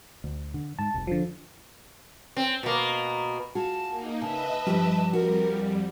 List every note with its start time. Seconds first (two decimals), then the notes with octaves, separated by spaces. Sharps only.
0.24 D2
0.54 D3
0.79 G#2 A5
0.94 F1 C2
1.07 D3 F3
2.37 C4
2.63 B2 A#3
3.55 F4 F#4 G#4 A5
3.89 A#3 D#4
4.22 C#3 B4 D#5 E5 A5
4.67 G2 F3 G3 G4
5.13 F2 G3 F#4 A#4